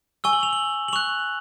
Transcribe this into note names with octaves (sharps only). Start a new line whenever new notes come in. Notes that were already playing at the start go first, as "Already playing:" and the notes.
G#5 C#6 E6 G7
F#7
F7
F#7
F#7
C#6 F#6 F7